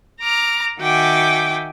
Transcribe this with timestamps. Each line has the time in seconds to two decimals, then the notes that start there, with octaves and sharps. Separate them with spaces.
0.21 A#5 D6 F6
0.79 D#3 F#4 E5 G5 G#5 D6